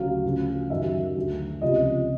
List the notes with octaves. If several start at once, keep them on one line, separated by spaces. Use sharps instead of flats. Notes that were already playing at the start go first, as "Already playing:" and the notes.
Already playing: D2 C#3 F#3 F5
D2 C#3 F3
F#2 D#3 F#3 E5
D2 D3 F#3
C#2 C3 F3 D#5